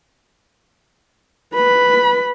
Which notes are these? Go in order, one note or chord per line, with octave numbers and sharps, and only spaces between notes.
B4 B5